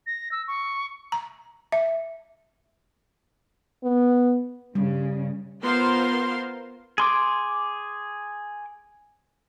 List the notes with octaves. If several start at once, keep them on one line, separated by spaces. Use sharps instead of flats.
A#6
E6
C#6
A#5
E5
B3
G2 C#3 G3
B3 F4 A#4 C5 F5 C6
G#4 C6 D6